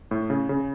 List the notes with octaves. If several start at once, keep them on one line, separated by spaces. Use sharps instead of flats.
A2
C#3
C#3